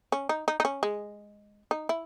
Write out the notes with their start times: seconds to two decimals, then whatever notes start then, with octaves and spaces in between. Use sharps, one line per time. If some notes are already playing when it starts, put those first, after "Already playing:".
0.12 C#4
0.29 D#4
0.48 D#4
0.60 D#4
0.65 C#4
0.83 G#3
1.71 D#4
1.89 E4